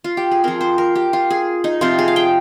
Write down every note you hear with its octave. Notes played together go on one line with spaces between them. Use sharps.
F4
G4
G#4
F3 C4 A#4
C5
A#4
G4
F4
G#4
D#4
C3 F3 C4 F4
G#4
F5
G5